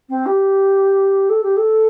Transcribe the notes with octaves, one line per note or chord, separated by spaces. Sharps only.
C4
G4
A4
G4
A4